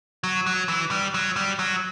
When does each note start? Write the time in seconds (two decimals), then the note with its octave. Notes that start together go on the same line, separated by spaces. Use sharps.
0.24 F#3
0.47 F#3
0.68 E3
0.91 G3
1.14 F#3
1.36 G3
1.59 F#3